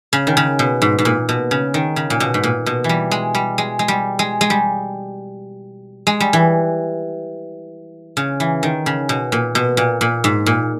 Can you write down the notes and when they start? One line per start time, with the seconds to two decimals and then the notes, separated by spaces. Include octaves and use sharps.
0.13 C#3
0.27 D#3
0.37 C#3
0.59 B2
0.82 G#2
0.99 G#2
1.05 A#2
1.29 B2
1.51 C#3
1.74 D#3
1.96 C#3
2.10 A#2
2.20 B2
2.34 G#2
2.43 A#2
2.66 B2
2.84 E3
2.89 G3
3.11 G#3
3.35 G3
3.58 G#3
3.79 G#3
3.88 G3
4.19 G#3
4.41 G#3
4.50 G3
6.07 G#3
6.20 G3
6.33 E3
8.17 C#3
8.40 E3
8.63 D#3
8.86 C#3
9.09 B2
9.32 A#2
9.55 B2
9.77 A#2
10.01 A#2
10.24 G#2
10.46 A#2